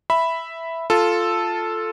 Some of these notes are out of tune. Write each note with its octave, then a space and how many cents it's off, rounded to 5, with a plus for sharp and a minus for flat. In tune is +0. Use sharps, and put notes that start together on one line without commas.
E5 +0 B5 +0
F4 +0 A4 +0